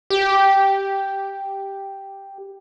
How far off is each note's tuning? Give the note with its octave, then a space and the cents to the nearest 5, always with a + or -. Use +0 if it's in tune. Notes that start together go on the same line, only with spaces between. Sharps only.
G4 +0